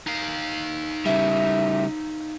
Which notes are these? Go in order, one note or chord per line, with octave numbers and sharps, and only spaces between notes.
D#4 F5
C#3 G3 E5